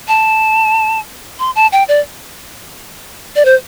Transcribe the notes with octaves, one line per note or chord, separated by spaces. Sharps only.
A5
C6
A5
G5
D5
D5
C5